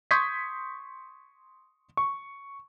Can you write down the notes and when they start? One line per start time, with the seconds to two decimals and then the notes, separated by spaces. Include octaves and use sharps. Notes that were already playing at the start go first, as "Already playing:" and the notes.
0.11 C6 C#6 D#6 G6 G#6 B6
1.97 C#6